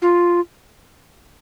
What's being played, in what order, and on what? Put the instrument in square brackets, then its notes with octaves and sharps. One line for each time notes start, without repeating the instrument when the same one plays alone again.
[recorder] F4